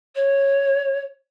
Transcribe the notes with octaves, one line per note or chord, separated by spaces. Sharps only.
C#5